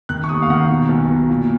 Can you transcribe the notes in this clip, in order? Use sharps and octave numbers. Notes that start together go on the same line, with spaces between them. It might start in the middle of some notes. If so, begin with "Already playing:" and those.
D#3 F#6
C#6
D#2 D#6
F5
D#3 F#5
B2
B1
B2
A#2